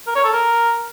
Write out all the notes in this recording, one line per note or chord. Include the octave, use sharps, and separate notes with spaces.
A#4
C#5
A4
A#4